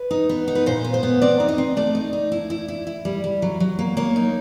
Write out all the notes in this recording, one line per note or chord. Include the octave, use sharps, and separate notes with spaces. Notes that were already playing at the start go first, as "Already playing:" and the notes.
Already playing: B4
D#4
B3
D#4
B4
A#2 C5
B3
C5
B3
C4 D5
D#4
D#5
C4
A3 D5
D#4
D#4
E4
E4
E4
E4
G3
G3
F#3
F#3
A#3
A#3 C#5
D#4